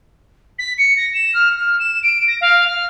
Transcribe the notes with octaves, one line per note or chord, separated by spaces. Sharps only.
B6
C#7
A#6
E7
F6
F6
E7
D7
A#6
F5
F6